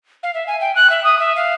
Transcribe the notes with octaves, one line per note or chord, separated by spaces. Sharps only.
F5
E5
G#5
G5
F#6
E5
D#6
E5
F5